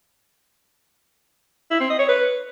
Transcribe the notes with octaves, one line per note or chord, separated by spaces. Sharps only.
E4
C4
D#5
C#5
B4